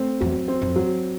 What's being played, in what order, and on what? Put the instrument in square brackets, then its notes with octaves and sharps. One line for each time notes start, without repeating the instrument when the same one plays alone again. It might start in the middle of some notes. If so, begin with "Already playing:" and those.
Already playing: [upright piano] A3 C4
[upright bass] E2 [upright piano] F#3
[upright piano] C4
[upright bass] F2
[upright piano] F#3